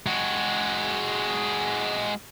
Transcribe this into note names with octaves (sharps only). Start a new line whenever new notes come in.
G#3 F#4